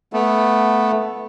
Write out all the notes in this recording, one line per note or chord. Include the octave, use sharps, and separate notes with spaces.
A3 B3